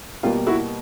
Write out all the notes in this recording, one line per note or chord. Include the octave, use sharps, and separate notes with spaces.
B2 G3 A#3 F4 G4
E4 F#4